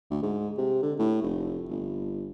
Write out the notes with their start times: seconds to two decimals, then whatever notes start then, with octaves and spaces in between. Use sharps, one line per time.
0.10 D2
0.22 G#2
0.58 C3
0.83 D3
0.99 A2
1.22 F1
1.69 G1